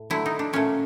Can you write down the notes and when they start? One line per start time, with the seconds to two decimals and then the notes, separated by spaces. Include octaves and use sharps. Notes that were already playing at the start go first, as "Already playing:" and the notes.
Already playing: A2
0.10 D3 F#3 A3 E4
0.26 D#4
0.39 D4
0.53 A#2 F#3 A3 C#4